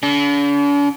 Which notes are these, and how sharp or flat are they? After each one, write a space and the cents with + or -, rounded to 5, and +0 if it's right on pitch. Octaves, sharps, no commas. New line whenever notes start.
D3 -45